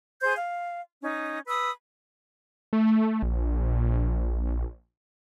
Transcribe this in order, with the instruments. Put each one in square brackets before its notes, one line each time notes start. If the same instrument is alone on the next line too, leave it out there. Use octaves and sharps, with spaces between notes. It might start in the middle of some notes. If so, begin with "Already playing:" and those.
[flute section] G#4 C5 C6 G6
F5
C#4 D#4
B4 B5 D#6 E6
[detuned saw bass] A3
A#1